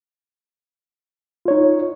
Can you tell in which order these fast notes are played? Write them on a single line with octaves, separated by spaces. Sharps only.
F4 C#5 D#4